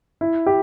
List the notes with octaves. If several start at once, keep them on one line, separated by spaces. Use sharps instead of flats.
E4
G4